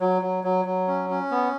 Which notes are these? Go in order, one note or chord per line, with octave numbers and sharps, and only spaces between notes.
F#3
F#3
F#3
F#3
C#4
C#4
B3